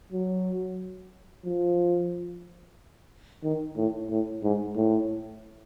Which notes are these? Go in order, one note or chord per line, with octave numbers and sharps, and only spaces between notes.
F#3
F3
D#3
A2
A2
G#2
A2